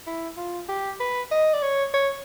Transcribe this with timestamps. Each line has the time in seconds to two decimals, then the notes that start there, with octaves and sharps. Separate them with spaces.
0.07 E4
0.37 F4
0.69 G4
1.00 B4
1.31 D#5
1.53 D5
1.62 C#5
1.94 C#5